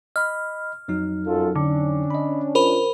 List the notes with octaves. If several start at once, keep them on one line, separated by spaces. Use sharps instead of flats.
D#5 B5 F6
F2 F#3 D#4
F#2 F4 A4
D3 C#4 D4
D#5 B5
F4 A#4 C5 B5